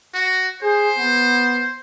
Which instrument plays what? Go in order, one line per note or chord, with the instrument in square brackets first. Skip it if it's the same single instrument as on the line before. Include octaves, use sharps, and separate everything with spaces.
[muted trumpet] F#4
[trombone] G#4 [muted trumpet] C5
[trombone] B3